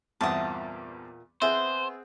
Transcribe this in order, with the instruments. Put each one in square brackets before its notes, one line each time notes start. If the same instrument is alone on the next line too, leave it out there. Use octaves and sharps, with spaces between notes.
[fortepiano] E2 G2 C4 [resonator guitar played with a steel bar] A#2 E5 F#5 [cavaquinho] A5 D#6
[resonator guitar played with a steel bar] B3 [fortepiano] C4 G#4 [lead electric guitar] C5 [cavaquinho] E5